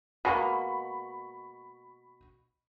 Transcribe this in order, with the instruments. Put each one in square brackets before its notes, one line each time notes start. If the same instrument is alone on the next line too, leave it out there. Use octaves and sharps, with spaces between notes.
[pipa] B2 G#3 A#3 [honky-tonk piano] B5 C#6